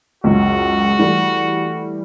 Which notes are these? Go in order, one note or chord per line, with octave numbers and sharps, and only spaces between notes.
C#2 F#2 F#4
E3 G3 A3